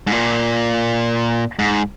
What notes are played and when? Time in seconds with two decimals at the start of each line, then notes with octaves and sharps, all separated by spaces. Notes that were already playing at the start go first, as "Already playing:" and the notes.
0.07 G#2
0.12 A#2
1.59 G#2